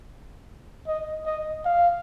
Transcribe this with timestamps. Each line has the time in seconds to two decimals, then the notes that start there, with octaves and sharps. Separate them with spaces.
0.87 D#5
1.26 D#5
1.65 F5